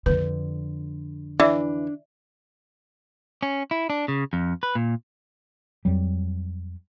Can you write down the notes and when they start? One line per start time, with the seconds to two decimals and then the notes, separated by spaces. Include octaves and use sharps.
0.06 F2 D3 B4
1.40 E3 D4 D5 E5
3.43 C#4
3.71 E4
3.90 D4
4.08 C#3
4.33 F2
4.63 B4
4.75 A#2
5.85 F2 F#3 G3